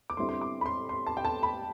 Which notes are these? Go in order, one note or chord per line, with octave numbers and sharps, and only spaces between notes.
D6
D3 G3 C4 E4 C6
C6
D6
B5
C6
C6
A5
G5
A5
B5